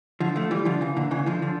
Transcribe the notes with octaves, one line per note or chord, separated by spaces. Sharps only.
D3 F3
F3 A3
E3 G3
D3 F3
C#3 E3
A#2 D3
C#3 E3
D3 F3
D3 F3